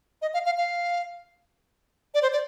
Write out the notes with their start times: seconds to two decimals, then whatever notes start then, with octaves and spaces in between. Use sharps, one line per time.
0.22 D#5
0.34 F5
0.46 F5
0.58 F5
2.14 D5
2.23 C5
2.33 D5